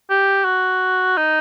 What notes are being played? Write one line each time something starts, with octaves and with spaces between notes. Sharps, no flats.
G4
F#4
D#4